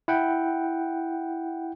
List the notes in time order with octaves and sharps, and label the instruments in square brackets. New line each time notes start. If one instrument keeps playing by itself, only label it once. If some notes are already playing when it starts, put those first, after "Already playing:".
[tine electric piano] E4 F#5 G5